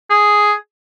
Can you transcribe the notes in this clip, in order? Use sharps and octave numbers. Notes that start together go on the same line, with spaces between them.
G#4